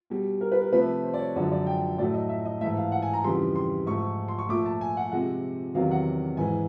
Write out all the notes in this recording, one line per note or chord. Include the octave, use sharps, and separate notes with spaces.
B2 G3
A#4
B4
A#4
C3 F3 A3 B4
C5
D5
C#5
F#2 D3 F3 G#3 D5
D5
G5
A2 F#3 A3 D5
D#5
E5
D#5
G#2 E3 A3 E5
F5
F#5
G#5
A#5
F2 C#3 E3 G3 C6
C6
G#2 F3 A3 C#6
C6
C#6
A#2 F3 A3 D6
A5
G#5
F#5
C3 F3 G#3 F#5
E2 C3 D#3 F#3 F5
F#5
G#2 E3 G#3 G#5